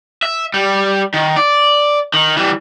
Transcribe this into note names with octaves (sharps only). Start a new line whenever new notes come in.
E5
G3
D#3
D5
D#3
E3 G3